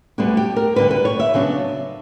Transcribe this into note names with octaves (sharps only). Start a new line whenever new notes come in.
D2 D3 G3 B3 D4
G4
A#4
D2 D3 G3 B4
B4
C#5
E5
C#3 F#3 B3 D4